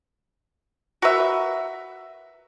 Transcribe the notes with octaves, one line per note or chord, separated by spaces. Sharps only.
F#4 A#4 B4 E5